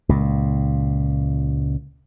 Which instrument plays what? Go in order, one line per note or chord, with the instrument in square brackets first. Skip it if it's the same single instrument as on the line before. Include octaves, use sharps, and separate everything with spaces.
[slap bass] C#2 A#2